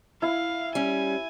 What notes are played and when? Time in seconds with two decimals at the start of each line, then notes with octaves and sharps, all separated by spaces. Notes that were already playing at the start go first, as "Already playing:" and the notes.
0.22 E4 F5
0.75 G3 C#4 G#5